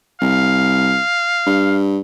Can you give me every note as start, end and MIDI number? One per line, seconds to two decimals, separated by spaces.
0.21 0.99 36
0.21 1.80 77
1.47 2.00 43